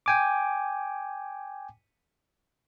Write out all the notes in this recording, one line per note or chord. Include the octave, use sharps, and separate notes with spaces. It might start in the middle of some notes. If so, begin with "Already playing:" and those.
G5 G#5 D6